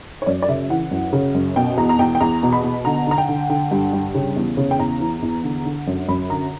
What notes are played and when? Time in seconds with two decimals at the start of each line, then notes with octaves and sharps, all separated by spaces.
0.22 C#5
0.26 F#2 D5
0.42 D5
0.49 C#3 E5
0.70 E3 F#5
0.91 F#2
1.13 C#3
1.35 F#2
1.56 B2 G5
1.77 E2 A#5
1.89 A#5
1.99 E2 G5
2.15 G5
2.21 E2 A#5
2.43 B2
2.53 B5
2.64 B2
2.85 D3 A#5
3.07 D3 A#5
3.18 G5
3.29 D3
3.50 D3
3.71 G2
3.93 G2
4.15 C#3
4.36 E2
4.57 C#3
4.71 G5
4.79 E2 A#5
5.00 E3
5.22 E2
5.44 D3
5.65 D3
5.87 F#2
6.09 F#2 B5
6.30 D3 A#5